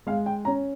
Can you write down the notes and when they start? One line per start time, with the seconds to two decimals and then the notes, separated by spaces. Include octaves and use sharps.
0.07 G#3 F5
0.26 G5
0.45 C#4 A#5